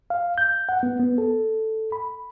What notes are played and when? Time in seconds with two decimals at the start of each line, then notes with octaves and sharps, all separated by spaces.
0.10 F5
0.38 G6
0.69 F#5
0.83 B3
1.00 B3
1.18 A4
1.92 B5